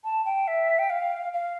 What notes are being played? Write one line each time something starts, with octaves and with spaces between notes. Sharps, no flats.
A5
G5
E5
G5
F5
F5